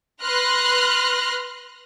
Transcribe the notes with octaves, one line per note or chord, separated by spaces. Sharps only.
B4 C6 F6 F#6 A#6